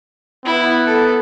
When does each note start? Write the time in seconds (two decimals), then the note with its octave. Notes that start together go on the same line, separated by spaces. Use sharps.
0.45 B3 E4
0.85 A4